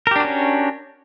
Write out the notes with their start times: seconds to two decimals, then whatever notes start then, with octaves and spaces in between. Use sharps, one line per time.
0.07 A#4
0.11 G4
0.16 D4
0.20 F#4
0.25 C#4